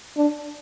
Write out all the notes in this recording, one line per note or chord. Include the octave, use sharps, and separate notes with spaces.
D4